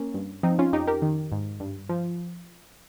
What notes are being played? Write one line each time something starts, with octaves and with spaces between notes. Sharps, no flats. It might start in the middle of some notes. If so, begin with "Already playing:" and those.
Already playing: A#3 C#4
G2
F3 C4 D#4
C#4 F4
F2 D#4 G4
G4 A#4
D#3
G#2
G2
F3